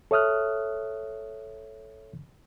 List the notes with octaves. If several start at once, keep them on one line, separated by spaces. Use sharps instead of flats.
A4 C#5 E5 D#6 F6 F#6